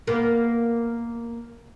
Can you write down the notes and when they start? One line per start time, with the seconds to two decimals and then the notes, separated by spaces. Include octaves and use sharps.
0.07 A#3 B3